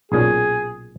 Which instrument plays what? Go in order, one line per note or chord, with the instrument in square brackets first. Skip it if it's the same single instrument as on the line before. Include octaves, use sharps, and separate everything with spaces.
[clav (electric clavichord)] B1 A#2 C#4 [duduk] G#4